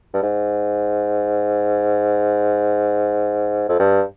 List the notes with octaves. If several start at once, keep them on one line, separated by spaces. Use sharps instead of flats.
G2
G#2
F2
G2